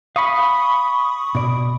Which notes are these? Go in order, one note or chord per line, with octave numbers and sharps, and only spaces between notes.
F5 B5 C#6 D#6
B2 D5